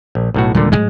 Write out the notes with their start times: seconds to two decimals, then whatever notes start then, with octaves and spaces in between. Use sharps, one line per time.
0.15 A#1
0.34 B1 A2 F#4
0.55 D#1 A#2 D3 G3 G#3
0.72 G#2 F#3 G#3